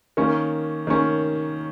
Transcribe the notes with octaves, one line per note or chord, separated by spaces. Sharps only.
D#3 A#3 C#4
D#3 A#3 C#4